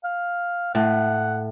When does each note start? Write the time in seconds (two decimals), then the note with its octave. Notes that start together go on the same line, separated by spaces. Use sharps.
0.04 F5
0.75 A2 F#5